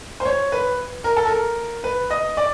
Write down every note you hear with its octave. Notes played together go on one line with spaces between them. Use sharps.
C5
C#5
B4
A#4
A4
A#4
B4
D#5
D5